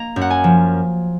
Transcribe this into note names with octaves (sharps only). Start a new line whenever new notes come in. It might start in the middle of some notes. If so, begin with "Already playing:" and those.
Already playing: A#3 A#5
F#2
F#5
G#5
F3